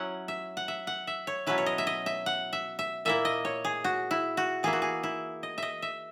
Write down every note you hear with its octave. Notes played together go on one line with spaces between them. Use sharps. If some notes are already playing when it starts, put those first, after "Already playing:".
Already playing: F#3 C#4 E4 F#5
E5
F#5
E5
F#5
E5
C#5
B2 F#3 C#4 E4 B4
C#5
D#5
E5
D#5
E5
F#5
E5
E5
A#2 A#3 E4 E5
D#5
C#5
G#4
F#4
E4
F#4
E3 A#3 E4 G#4
F#4
G#4
E4
D#5
D#5 E5
E5